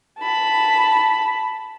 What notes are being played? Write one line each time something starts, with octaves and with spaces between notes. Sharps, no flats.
A5 B5